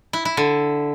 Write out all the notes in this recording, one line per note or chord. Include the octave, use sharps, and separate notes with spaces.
E4
E4
D3